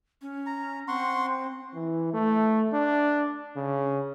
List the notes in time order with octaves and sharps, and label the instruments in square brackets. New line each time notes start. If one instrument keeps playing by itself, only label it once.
[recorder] C#4
[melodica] A#5
[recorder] C4 [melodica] F#5 C6 C#6
[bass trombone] E3
A3
D4
C#3